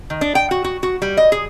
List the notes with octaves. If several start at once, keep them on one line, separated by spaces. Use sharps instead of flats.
D#3
D4
G5
F#4
F#4
F#4
G3
D#5
G#4